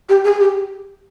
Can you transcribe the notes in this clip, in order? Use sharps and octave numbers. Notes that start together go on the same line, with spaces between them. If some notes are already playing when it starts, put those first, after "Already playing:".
G4
G#4
G4